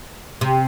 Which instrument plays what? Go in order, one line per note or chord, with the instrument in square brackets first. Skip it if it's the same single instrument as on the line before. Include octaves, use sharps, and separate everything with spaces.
[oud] C3